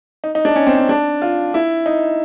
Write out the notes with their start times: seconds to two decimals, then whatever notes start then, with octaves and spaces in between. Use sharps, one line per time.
0.24 D#4
0.35 D#4
0.45 D4
0.56 C#4
0.67 C4
0.78 C#4
0.89 D4
1.22 F4
1.54 E4
1.86 D#4